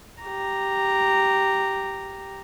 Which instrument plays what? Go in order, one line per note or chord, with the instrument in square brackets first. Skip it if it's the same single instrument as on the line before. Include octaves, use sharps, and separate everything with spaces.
[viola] G4 A#5